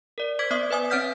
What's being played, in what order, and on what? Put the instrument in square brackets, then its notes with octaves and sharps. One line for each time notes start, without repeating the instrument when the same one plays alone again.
[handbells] A#4 D5
C5 D6 G#6 B6
B3 D5 E5 D6 D#6
B4 E5 G#5 D#6
C4 C#5 F#5 F6 G6 B6